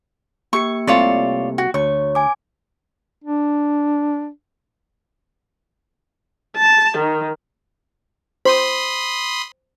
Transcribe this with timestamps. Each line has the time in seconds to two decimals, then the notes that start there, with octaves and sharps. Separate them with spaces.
0.53 A#3 G4 C#6 C#7
0.87 C2 C3 A3 F4 C#5 D5
1.58 F#4
1.74 D2 C#5 C#6
2.15 G#5 D6
3.24 D4
6.56 A5
6.98 D#3
8.45 C5 B5 C6 D#6